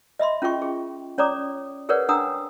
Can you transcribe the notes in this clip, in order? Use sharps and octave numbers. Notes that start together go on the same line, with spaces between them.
D#5 E5 B5 C6
C#4 F4 G#4 G5 C#6
G#4
C#4 C#5 D5 A#5 D6 D#6
G#4 A#4 B4 C#5 D5 F#5
D4 F#5 G5 A#5 D#6 E6